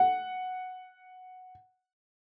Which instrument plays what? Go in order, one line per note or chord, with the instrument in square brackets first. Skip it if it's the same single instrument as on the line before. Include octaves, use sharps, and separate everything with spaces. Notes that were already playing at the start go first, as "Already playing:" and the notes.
Already playing: [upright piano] F#5